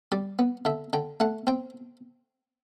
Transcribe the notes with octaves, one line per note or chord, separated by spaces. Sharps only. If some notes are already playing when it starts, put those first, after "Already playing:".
G3 D5
B3
D3 E5
D3 G5
A3 F#5
C4 G5